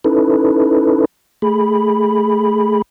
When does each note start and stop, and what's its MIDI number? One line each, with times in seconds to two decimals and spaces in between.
0.04 1.05 61
0.04 1.05 63
0.04 1.05 64
0.04 1.05 69
0.04 1.05 71
1.42 2.82 57
1.42 2.82 68
1.42 2.82 83